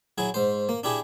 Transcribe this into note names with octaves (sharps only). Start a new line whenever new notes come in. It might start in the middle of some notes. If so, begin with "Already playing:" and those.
F#3 E4 G#4
G#2 C5
A#3
D4 E4 G4 G#4